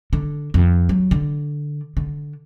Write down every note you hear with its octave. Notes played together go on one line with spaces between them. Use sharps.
D3
F2
F#3
D3
D3